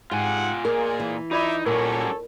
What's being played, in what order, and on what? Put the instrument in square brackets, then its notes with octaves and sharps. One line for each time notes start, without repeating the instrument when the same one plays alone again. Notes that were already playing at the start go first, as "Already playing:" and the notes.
[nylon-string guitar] G#2 [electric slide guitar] F4 G#5 [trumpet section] G4 G#4 F#5
[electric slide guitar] A#2 [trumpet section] G#3 A#3 G#4 [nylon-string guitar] A#4
[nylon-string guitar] E3
[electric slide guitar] D#4 [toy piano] F4 D5 B5 [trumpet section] E5 D6
[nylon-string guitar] A#2 [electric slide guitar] F#3 G3 C#4 [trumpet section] A4 C#5 [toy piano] A#4